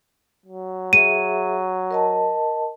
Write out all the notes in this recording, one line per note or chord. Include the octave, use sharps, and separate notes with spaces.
F#3
G#4 E5 D#7
A#4 D#5 A5